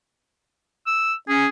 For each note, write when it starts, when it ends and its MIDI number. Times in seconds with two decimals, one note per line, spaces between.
0.87 1.13 88
1.29 1.47 61
1.29 1.48 68